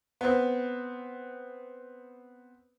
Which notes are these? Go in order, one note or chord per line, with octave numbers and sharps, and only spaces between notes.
B3 C4